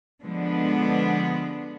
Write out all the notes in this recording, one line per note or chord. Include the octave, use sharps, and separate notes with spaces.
D3 F3 G#3 B3 D4